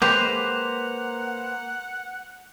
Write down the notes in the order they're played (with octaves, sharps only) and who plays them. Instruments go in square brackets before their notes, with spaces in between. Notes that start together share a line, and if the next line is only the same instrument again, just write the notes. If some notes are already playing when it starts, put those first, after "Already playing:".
[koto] G#3 G4 [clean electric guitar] A#3 B4 C5 [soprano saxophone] F#5 [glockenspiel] G6 F7